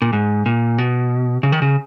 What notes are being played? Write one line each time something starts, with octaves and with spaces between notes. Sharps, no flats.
A#2
G#2
A#2
B2
C#3
D#3
C#3